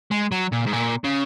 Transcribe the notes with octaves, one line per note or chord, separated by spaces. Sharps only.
G#3
F#3
A#2
G#2
A#2
C#3